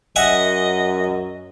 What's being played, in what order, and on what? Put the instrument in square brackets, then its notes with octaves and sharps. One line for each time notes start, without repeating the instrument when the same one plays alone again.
[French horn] F#2 [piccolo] D#5 [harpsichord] E5 F#5 G#5